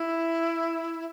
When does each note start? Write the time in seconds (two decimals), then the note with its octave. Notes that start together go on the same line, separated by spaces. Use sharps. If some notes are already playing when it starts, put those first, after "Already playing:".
Already playing: E4